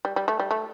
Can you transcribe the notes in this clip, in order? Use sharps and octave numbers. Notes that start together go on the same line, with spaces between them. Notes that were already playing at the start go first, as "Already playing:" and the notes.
G3
G3
A3
G3
A3